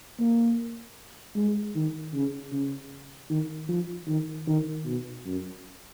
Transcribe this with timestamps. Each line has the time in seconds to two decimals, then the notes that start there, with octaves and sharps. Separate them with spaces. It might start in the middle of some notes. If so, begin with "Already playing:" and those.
0.19 A#3
1.36 G#3
1.75 D#3
2.14 C#3
2.52 C#3
3.30 D#3
3.69 F3
4.08 D#3
4.47 D#3
4.85 B2
5.25 F#2